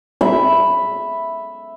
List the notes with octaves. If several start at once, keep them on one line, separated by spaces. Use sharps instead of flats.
E5 B5